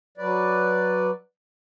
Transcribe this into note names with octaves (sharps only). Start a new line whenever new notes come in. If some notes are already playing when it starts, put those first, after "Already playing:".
F#3 B4 D5